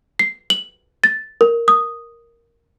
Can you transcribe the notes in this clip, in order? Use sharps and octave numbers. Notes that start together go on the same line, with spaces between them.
C7
F#7
A6
A#4
D#6